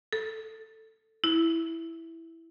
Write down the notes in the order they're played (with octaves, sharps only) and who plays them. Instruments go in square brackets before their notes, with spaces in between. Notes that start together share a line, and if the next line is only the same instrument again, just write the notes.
[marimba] A4
E4